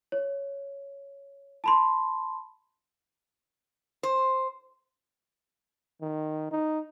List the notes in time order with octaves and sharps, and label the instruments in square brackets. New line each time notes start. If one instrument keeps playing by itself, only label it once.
[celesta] C#5
A5 B5 C6
[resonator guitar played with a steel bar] C5
[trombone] D#3
D#4